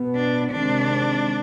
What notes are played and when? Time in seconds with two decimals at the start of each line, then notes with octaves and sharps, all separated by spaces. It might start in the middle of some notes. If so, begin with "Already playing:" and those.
Already playing: B2 B3
0.16 D4
0.52 C3 D#3 G#3 C4 D4